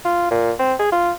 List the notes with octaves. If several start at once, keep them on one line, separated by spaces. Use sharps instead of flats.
F4
A#2
C4
G#4
F4